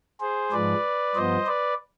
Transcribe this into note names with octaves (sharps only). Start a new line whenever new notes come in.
G#4 C5
G#2 F3 G#3 B4 D5
G2 F3 B3 C5 D#5
B4 D5